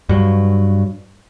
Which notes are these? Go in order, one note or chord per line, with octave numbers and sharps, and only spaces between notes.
G2 F#3